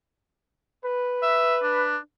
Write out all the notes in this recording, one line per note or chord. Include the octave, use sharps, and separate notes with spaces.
B4
E5
D4